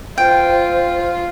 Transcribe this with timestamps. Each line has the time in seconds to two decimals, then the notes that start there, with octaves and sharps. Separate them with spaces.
0.18 F4 C5 G5